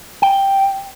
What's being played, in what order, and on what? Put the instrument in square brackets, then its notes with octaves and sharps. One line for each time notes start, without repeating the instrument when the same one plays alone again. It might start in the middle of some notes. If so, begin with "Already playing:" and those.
[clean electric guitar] G5